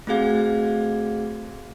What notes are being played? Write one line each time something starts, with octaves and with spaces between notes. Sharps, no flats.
A3 C4 F#4 G#4 F5 G#6